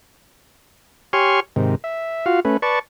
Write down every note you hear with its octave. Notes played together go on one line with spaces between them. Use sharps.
G4 C#5 G#5 C6 C#6 F6
G#2 C3 D#3
E5
F4 F#4 F5
A3 C#4 B4
B4 D5 A5 C#6